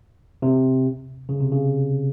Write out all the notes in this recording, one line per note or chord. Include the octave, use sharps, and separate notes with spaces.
C3
C#3
C3
C#3